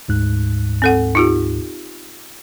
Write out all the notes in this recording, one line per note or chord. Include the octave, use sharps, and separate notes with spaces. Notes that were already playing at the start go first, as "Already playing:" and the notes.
D2 G#2 F#6
C4 A4 F#5
D#4 F4 G4